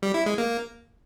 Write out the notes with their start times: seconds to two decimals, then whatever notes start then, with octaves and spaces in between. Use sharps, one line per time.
0.02 G3
0.14 E4
0.26 G#3
0.38 A#3